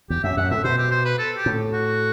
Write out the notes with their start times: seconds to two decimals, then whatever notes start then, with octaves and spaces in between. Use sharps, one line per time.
0.10 E2 G4
0.24 F#2 E5
0.37 F#2 F#5
0.51 A2 E5
0.64 B2 C5
0.78 G4
0.91 C5
1.05 B4
1.19 A4
1.37 G4
1.46 A2
1.73 F#4